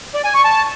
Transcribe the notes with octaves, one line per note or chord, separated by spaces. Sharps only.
D5
G#5
C#6
A5